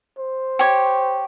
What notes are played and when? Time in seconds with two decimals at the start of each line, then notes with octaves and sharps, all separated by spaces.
0.19 C5
0.59 G4 C#5